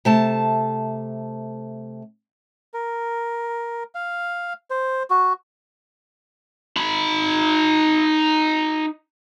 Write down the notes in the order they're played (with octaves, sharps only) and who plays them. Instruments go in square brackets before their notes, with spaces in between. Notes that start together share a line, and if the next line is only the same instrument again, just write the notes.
[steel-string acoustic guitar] C3 A3 A5
[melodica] A#4
F5
C5
F#4
[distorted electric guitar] D#4 B5